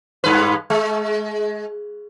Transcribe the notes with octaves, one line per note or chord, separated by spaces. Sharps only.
G2 B4
G#3